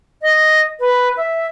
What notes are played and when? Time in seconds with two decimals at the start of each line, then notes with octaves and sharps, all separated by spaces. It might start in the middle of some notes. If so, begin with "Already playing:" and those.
0.22 D#5
0.80 B4
1.17 E5